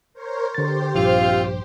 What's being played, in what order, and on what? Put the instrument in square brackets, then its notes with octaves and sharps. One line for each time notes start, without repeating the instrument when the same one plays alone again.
[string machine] A#4 C5 C#5
[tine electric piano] D3 A6 [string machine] G4 C5
[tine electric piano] A#1 G2 [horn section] C4 F4 F5